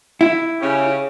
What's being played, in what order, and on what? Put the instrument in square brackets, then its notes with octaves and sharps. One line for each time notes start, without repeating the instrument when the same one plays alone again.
[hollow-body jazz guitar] E4
[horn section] C#3 C#4 G4